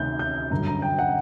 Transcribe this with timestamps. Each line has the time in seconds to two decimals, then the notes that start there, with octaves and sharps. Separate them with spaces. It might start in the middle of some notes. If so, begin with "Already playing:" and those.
Already playing: D2 C3 D#3 G6
0.19 G6
0.51 G2 D3 F#3 A#5
0.67 A#5
0.82 G5
0.99 F#5